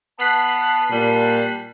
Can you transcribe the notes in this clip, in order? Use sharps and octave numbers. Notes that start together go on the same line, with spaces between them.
B3 A5 F#6 B6 C7
A#2 G3